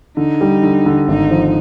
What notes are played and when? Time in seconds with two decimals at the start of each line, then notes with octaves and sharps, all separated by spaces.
0.17 D3 D#4
0.41 G3
0.63 D3
0.86 D3
1.08 G#1 D#4
1.31 F3